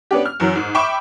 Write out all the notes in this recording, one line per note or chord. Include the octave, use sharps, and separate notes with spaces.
B3 C#4 D4 G4
F6
F#2 E3 F#3
G#2
E5 G5 B5 C#6 D6 E7